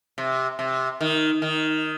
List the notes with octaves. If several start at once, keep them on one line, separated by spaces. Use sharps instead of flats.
C3
C3
D#3
D#3